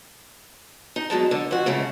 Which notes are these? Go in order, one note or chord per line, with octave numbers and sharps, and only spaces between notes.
D#4
B2 F#3 G#3 A5
D3
F2 F#4
G#2 C#3 A3